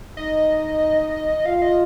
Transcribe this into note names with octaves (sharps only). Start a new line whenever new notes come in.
D#4 D#5
F4 F5
D#5